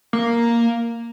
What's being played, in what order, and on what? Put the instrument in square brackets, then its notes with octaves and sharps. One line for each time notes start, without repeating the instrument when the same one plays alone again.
[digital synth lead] A#3